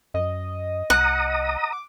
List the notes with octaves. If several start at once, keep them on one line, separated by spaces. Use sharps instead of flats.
F#2 D#5
C2 F#5 A#5 D#6
D6